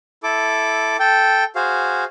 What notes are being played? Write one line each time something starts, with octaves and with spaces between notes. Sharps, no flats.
E4 A4 D6
A4 G5
F#4 G#4 C5 F5